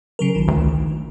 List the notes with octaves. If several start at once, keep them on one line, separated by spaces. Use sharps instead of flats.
C#3 F#3 A#4
A#1 D#3
D2